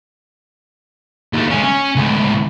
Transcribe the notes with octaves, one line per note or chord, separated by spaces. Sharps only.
D#2 A3
G#3 C#4
C#4
C#2 A2